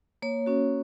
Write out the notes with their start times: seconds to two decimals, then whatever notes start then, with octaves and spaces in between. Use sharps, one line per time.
0.22 A#3 C#5
0.46 C#4 F#4